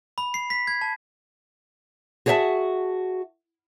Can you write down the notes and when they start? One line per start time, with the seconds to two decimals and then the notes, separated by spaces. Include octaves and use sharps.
0.18 B5
0.34 C7
0.50 B6
0.67 G#6
0.81 A5
2.26 F#4 G#4 C#5 D#5 E5 A5